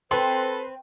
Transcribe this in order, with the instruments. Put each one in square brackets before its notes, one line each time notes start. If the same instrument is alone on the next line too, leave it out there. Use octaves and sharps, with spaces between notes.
[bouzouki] C4 [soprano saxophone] A4 [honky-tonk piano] B4 C6 [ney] C5